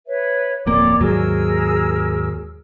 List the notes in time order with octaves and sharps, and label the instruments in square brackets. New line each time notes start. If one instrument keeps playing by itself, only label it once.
[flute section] B4 C#5 E5
[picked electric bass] D1 F2 A#3 [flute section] C#5 D5 D6
[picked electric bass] D#2 G#2 F#3 [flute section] G#4 A#4 E6